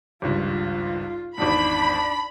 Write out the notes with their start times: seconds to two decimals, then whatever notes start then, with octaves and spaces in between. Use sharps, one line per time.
0.22 G#1 C#2 G2 F4
1.38 G#1 E2 G#2 D4 B5